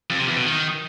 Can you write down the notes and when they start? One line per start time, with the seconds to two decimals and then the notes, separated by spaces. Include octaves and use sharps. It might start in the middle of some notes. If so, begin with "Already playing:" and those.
0.10 F2
0.19 C3
0.28 E2
0.36 B2
0.45 D#3